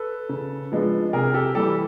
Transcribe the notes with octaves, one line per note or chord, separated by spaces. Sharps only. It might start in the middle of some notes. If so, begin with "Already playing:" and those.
Already playing: A4 B4
C#3
F3 G#3 B3 D4
C3 G#4 A#4
G4 A4
E3 G3 G4 A4